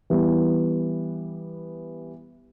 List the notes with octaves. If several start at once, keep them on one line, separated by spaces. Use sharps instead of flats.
E3 G3 B3